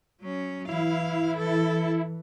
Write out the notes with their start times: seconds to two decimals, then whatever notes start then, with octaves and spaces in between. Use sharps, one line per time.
0.21 F#3 C#4
0.69 E3 E4 F5
1.37 A4